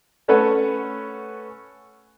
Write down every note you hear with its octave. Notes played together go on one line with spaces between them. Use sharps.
A3 C#4 A4 B4 C#5 F#5